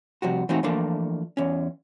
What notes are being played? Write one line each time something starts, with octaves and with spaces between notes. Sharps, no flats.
C3 F3 G3 F#4
E3 A3 C4 C#4 D#4 F#4
E3 F3 A3 A#3 D4
E2 C#4